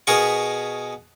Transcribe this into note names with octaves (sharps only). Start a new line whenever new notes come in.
B2 B3 G#4 A#4 C#6